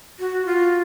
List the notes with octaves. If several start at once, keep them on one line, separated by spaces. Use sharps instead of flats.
F#4
F4